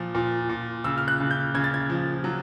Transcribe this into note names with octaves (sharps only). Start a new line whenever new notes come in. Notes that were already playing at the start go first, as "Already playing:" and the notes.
Already playing: A#2 F3
A#2
A#2
C#3 E6
F6
F#6
C#3
G6
C#3 G#6
A6
G#6
F3
F#3